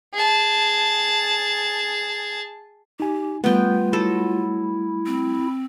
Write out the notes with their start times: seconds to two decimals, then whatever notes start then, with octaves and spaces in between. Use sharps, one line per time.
0.13 G#4 A5
3.00 D#4 G4 G#5
3.44 G3 A3 B3 F4 G5
3.93 F#3 E4 A4
5.06 C4